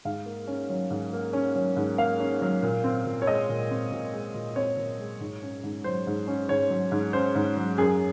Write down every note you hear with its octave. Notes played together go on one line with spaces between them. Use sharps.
G#2 F5
A#3
C#4
F#3
G#2
A#3
C#4
F#3
G#2
A#3 F5
C#4
F#3
A#2
C4
A#2
C#5
G#3 D#5
A#2
C4
A#2
G#3
A#2
C4 C#5
A#2
G#3
G#2
C#4
G#2
F#3 C5
G#2
C#4
G#2 C#5
F#3
G#2
C#4 C5
G#2
F#3
F#2 G#4